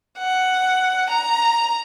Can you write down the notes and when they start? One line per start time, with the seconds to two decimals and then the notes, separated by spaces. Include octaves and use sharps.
0.18 F#5
1.10 A#5